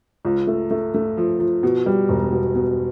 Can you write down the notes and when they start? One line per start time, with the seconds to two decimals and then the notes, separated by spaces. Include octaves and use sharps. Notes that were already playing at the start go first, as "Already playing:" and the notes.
0.25 C#2
0.47 A3
0.71 A3
0.94 A3
1.17 F3
1.39 F3
1.63 B2
1.86 G3
2.09 E1
2.32 B2
2.55 B2